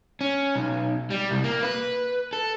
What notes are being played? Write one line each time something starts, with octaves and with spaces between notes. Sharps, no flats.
C#4
B1
G3
C2
A#3
B4
A4